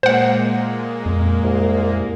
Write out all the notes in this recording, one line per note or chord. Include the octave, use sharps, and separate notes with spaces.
A#2 G#3 A#3 C5 F#5
F2
C2